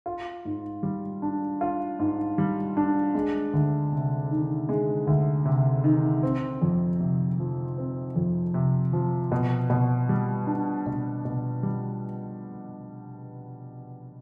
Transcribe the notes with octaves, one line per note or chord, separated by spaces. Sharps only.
F4
G#2
G3
D4
F4
G#2
G3
D4
G#3
D2
C3
D#3
G#3
D2
C3
D#3
C4
F2
C3
F3
C4
F2
C3
F3
B2
B2
G3
D4
B2
B2
G3